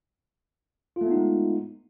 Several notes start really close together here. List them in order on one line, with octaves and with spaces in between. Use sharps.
F4 A3 B3 D#4 G#3